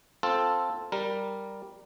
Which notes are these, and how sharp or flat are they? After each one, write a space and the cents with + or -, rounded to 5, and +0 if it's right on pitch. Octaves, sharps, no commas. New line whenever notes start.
C4 +0 F4 +0 A4 +0
G3 +0 A#4 +0